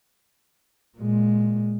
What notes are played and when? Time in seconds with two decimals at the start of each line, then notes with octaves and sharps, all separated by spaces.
0.98 A#2 G#3